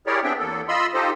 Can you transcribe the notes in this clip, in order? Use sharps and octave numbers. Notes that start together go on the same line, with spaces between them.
E4 G4 G#4 A#4 C#5 D5
B3 C4 D4 G#4 E5 G5
E2 A#3 A4
F4 D#5 B5 C6 E6
D#4 F4 G4 A4 C5 D#5